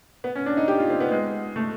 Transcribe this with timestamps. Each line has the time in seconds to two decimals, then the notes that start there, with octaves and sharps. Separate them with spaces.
0.24 B3
0.35 C#4
0.46 D4
0.57 D#4
0.68 G4
0.79 F4
0.90 C4
1.00 B3
1.12 G#3
1.56 A3